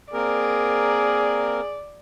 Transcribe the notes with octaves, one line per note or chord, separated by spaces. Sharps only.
A#3 C4 G#4 A#4 D5